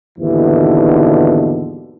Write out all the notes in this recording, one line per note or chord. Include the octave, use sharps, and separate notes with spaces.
D#2 G#2 B2 D3 E3